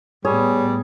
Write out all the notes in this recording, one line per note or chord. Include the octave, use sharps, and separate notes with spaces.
A2 G3 B3 G#4 C#5